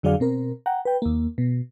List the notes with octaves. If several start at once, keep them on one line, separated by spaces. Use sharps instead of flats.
F2 D3 F#3 G#4 D5 F5
B2 C4 A#4
F#5 G5 A#5
B4 G5
D#2 A#3
B2